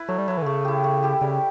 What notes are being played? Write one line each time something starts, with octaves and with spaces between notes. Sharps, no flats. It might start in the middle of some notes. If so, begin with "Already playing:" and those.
Already playing: E4 B4
F#3 A3
G3
F#3 E4 B4
E3
D3
C#3 A3
E4 G4
A3
E4 G4
C#3 G3